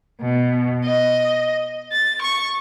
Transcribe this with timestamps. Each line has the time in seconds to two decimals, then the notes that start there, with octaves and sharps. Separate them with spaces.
0.22 B2
0.85 D#5
1.92 A6
2.21 C#6